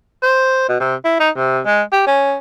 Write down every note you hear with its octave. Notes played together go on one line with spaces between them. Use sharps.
C5
B2
C3
E4
D#4
C3
G#3
G4
C#4